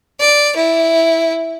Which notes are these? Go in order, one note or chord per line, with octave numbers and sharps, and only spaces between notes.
D5
E4